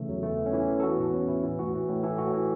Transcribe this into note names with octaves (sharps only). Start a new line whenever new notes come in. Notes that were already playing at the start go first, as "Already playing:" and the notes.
Already playing: C#3 E3 A3
E2 F#3
E3 A3
E2 B3
C#4
E3 E4
E2
A4
E3 F#4
A2 B3
E3 C#4
A2 E4
E3
A2 F#4
E3
A2
E3 A4
A2 F#4
E3